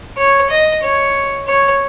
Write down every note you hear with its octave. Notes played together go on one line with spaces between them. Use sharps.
C#5
D#5
C#5
C#5